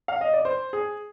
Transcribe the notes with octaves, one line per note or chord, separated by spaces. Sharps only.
F5
D#5
D5
C5
G#4